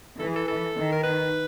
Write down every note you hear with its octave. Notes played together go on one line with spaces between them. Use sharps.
E3 A4
G#4
A4
A4
D#3
A#4
B4